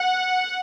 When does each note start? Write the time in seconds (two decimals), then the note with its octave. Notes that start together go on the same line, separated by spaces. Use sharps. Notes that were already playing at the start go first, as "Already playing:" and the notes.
Already playing: F#5